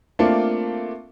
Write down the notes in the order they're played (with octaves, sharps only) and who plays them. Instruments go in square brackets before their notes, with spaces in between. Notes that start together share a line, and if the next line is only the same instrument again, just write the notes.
[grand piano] A3 A#3 C4 D4 F4